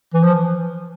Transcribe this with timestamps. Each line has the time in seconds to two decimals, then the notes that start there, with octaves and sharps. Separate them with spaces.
0.14 E3
0.23 F3